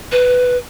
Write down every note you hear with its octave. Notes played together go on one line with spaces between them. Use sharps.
B4